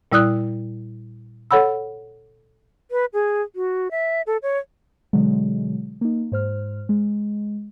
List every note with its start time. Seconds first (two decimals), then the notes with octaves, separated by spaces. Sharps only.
0.12 A#2 G3 E4 D5 D#6 F#6
1.51 A4 C#5 F#5 B5 E6
2.91 B4
3.13 G#4
3.56 F#4
3.91 E5
4.27 A4
4.43 C#5
5.13 B2 D3 F#3 G#3
6.01 A#3 D#4
6.32 G#2 C5 F6
6.89 G#3